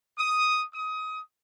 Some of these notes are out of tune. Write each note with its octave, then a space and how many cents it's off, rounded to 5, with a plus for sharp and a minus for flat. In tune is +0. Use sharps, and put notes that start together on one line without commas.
D#6 +5
D#6 +20